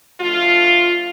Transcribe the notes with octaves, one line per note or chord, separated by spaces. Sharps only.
D3 F3 A3 F4